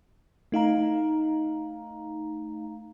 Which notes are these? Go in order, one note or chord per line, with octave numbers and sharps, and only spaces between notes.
A3 D#4 F5 A#5